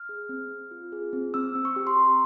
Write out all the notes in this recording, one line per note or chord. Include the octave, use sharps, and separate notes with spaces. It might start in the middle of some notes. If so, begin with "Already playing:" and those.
Already playing: F6
G#4
C4
C4
F4
G#4
C4
C4 E6
C4
C#6
G4
C6
G4 A#5